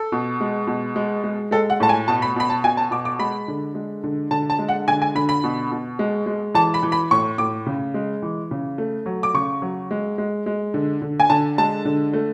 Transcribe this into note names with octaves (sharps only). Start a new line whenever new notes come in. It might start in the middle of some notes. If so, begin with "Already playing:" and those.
Already playing: A4
B2
G#3
B2
G#3
G#3
G#3 A4
F#5
A2 A5
G#5
B2 A5
B5
B2 B5
A5
B2 G#5
A5
B2 D6
D6
G#3 B5
D3
G#3
D3
D3 A5
A5
G#3
F#5
D3 G#5
G#5
D3 B5
B5
B2
B2
G#3
G#3
E3 A5
B5
E3
B5
A2 C#6
A2 D6
C#3
G#3
E3
C#3
A3
F#3
D6
C#3 C#6
F#3
G#3
G#3
G#3
D3
D3
G#5
D3 A5
G#3 A5
D3
A3